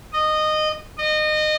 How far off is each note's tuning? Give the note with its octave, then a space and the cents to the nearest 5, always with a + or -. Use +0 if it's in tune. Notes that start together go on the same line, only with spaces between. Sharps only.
D#5 -15
D#5 -25